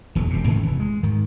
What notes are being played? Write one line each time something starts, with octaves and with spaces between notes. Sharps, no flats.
D#1 E2 F#3
E1 C3
G#2 D#3 E3 C#4
F1 E3
G#3
G#2 D#3